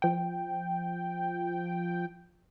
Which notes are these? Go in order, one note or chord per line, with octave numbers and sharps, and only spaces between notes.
F3 G5